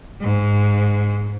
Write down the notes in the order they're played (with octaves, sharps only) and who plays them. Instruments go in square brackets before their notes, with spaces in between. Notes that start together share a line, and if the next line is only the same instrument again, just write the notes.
[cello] G#2